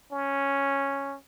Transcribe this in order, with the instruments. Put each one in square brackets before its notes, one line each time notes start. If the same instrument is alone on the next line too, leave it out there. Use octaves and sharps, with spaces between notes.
[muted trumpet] C#4